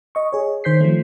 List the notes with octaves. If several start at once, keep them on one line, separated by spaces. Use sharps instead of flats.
D#5 C#6
G#4 C#5
D#3 C5 G6 B6 C7
F3 A3